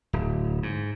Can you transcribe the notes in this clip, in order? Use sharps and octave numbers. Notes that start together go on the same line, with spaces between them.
D1
G#2